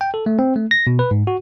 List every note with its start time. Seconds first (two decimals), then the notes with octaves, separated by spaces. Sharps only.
0.01 G5
0.14 A4
0.26 A3
0.39 C4
0.56 A3
0.71 A#6
0.87 B2
0.99 B4
1.11 G#2
1.27 F#4